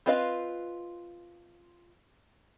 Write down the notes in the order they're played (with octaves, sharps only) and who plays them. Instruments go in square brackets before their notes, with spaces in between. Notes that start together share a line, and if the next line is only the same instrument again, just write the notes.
[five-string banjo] C4 F4 B4 D#5 F5